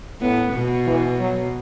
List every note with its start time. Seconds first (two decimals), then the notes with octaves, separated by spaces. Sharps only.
0.21 A2 B3
0.54 B2
0.87 E3
1.19 F#3